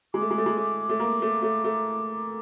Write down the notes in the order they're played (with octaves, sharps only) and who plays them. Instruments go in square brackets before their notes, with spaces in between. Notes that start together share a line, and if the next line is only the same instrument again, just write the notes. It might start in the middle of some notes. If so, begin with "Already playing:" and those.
[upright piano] G#3 [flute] D6
[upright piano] A3
G#3
A3
G#3
A3
A3
A#3
A3
A3
A3